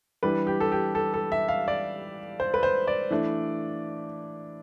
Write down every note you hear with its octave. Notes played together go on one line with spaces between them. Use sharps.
E3 G3 D4 B4
G4
A4
G4
A4
A4
E5
F5
D5
C5
B4
C5
D5
E3 A3 D4